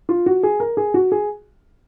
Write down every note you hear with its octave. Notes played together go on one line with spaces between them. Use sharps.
F4
F#4
G#4
A#4
G#4
F#4
G#4